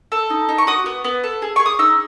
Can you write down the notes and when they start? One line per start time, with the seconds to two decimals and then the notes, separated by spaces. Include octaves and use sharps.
0.12 A4
0.30 D#4
0.49 D#4
0.58 C#6
0.67 F#4 D#6
0.86 B3
1.04 B3
1.24 A4
1.42 G#4
1.56 G#4 C#6
1.66 D#6
1.79 D#4 E6